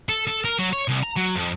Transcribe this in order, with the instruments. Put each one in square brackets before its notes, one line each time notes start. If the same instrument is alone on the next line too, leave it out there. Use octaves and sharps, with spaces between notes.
[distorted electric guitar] A4
A4
A#4
F#3
C#5
C2
A#5
F#3
F2